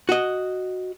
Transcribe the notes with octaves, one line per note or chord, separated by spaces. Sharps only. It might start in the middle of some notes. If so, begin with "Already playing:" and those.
F#4 D#5